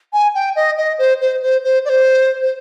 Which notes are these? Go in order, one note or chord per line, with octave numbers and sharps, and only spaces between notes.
G#5
G5
D#5
D#5
C5
C5
C5
C5
D5
C5
C5